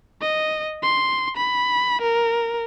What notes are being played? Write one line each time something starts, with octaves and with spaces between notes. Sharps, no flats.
D#5
C6
B5
A#4